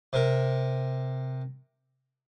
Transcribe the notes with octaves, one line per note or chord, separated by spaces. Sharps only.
C3 A#4